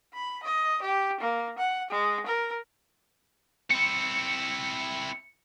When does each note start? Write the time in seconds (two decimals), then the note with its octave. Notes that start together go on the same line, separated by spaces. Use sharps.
0.14 B5
0.43 D#5
0.82 G4
1.20 A#3
1.58 F#5
1.90 G#3
2.26 A#4
3.70 C4 E4 C#7